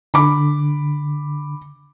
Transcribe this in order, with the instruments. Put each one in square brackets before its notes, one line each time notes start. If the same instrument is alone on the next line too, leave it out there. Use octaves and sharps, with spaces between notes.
[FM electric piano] D3 [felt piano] B5 D6